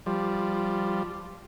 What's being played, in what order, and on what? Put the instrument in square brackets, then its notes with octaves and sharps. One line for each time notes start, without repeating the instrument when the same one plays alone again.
[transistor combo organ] F3 G3